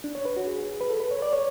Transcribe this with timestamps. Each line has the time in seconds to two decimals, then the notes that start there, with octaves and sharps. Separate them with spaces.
0.04 D4
0.15 C#5
0.25 B4
0.37 F#4
0.47 G#4
0.81 B4
0.90 A4
1.00 B4
1.11 C#5
1.22 D5
1.33 C#5